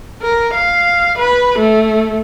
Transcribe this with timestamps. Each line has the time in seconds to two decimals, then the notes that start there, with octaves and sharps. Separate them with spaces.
0.22 A#4
0.54 F5
1.18 B4
1.59 A3